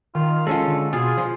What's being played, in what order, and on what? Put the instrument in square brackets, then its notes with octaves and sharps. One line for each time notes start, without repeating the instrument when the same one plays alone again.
[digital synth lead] D#3 [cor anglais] F4
[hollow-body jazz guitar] G#3 C#4 F4 [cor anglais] A4
[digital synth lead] D3
[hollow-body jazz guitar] B2 [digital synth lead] F4 [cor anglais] G#4
[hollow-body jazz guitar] F3